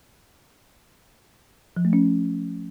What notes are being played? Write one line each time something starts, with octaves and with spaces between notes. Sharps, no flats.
F3
A3
C#4